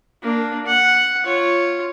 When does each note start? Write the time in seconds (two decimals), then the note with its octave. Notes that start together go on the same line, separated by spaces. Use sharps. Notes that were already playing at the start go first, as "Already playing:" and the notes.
0.22 A#3 D4
0.66 F#5
1.25 F4 C#5